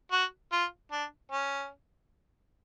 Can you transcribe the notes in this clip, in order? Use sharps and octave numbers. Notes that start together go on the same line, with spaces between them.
F#4
F4
D4
C#4